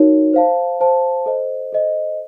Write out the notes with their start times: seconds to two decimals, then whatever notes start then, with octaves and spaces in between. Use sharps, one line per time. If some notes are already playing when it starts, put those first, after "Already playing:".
Already playing: D#4 F#4 A#4 C#5
0.33 C5 F5 A5
0.80 C5 F5 A5
1.26 A4 C5 D#5
1.73 A4 C5 D#5